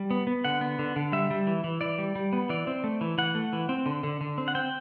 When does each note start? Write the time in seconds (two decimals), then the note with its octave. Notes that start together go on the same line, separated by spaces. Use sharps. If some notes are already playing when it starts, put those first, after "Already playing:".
Already playing: G3
0.10 B3
0.27 B3
0.44 D3 F#5
0.61 B3
0.79 D3
0.96 D3
1.12 G3 E5
1.31 G3
1.47 E3
1.64 E3
1.81 E3 D5
1.98 G3
2.15 G3
2.33 B3
2.49 E3 D5
2.67 C4
2.84 A3
3.01 E3
3.18 E3 F#5
3.35 A3
3.53 E3
3.69 C4
3.86 D3
4.03 D3
4.21 D3
4.38 C4
4.48 F#5
4.55 C4 G5